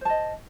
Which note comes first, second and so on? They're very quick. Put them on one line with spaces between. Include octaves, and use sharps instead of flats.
C5 A5 D#5